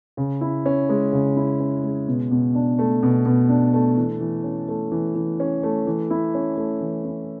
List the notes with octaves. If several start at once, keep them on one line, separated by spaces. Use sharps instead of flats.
C#3
E4
C#4
G#3
C#3
E4
C#4
G#3
B2
B2
D4
A3
B2
B2
D4
A3
E3
E3
C#4
A3
E3
E3
C#4
A3
E3
E4
C#4
A3
E3
E4